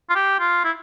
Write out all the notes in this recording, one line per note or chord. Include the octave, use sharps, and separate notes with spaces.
F4
G4
F4
E4